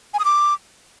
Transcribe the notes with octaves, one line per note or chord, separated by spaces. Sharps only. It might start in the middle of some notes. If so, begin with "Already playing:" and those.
G#5
D#6
D6